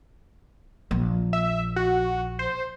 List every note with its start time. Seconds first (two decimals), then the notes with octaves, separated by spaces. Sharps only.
0.91 A#1
1.33 E5
1.76 F#4
2.39 C5